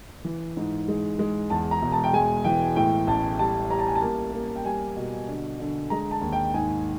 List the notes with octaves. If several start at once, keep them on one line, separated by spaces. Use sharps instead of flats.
E3
G#2
G#3
G#3
E2 A5
A#5
E1
A5
G5
G#3 G#5
E3 G5
A2 G5
A1 A5
G3 A5
G3 A#5
A5
G#5
A5
A#3
A#3
G5
G3 G#5
B2
D3
D3
G#3 A#5
A5
D#2
G5
G#2 G#5